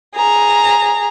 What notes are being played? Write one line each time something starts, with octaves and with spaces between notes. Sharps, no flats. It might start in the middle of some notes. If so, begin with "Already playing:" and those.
G#4 A#5